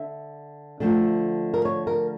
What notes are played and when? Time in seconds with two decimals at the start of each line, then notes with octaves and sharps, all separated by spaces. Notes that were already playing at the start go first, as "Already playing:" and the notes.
Already playing: D3 E5
0.80 D3 F3 A3
1.54 A#4
1.65 C#5
1.87 A#4